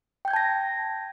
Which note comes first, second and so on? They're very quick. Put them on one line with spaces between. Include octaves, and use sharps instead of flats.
G5 G6 G#6 A5 A#6